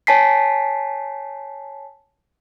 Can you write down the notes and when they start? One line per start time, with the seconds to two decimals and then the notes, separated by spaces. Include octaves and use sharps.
0.07 C#5 G#5 A5 B6 C7